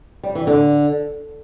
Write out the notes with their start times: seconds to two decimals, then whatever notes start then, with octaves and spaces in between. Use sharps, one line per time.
0.23 G3
0.35 E3
0.47 D3